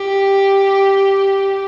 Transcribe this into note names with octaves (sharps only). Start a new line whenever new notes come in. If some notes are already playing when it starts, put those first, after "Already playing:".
Already playing: G4